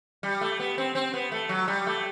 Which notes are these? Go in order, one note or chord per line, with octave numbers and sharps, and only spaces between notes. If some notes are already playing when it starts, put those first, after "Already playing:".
G3
A3
B3
C4
C4
B3
A3
F#3
G3
A3